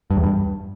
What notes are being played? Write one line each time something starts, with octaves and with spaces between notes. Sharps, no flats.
G2
E2
G2